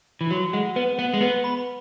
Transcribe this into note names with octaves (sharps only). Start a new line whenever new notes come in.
E3
F#3 F#4
G#3 F#5
B3 B4
B3 F#5
G#3
B3 B4
B5